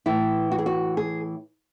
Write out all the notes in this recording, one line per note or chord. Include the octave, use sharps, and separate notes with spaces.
A2 E3 E4
F#4
G#4
F#4
G#4